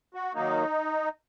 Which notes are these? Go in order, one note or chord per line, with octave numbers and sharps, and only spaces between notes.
F#4
D#3 F#3 A#3 D#4